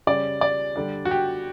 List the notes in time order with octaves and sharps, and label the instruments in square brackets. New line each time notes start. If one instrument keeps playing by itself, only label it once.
[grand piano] C#3 G3 C#4 D5
D5
D3 G3 D4
F#4
G4